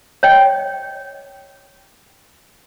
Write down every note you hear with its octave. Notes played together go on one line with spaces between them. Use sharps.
C#5 D#5 G5